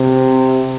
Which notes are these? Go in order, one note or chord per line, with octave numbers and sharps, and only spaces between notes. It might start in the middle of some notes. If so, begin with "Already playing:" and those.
Already playing: C3